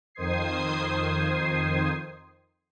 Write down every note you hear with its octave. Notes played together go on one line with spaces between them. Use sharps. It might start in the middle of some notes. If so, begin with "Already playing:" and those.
F2 D#3 C5 D#6 G#6 C7